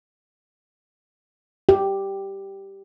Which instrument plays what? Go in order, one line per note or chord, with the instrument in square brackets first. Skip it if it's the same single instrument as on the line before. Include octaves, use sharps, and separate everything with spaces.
[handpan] G4